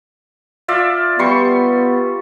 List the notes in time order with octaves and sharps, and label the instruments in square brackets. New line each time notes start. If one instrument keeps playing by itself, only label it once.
[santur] F4 D5 E5
[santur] G3 C6 C#6 [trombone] B3